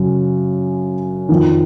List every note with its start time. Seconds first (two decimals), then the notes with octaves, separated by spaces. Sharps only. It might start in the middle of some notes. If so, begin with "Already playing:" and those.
Already playing: F#2 C#3
1.29 F2 D#3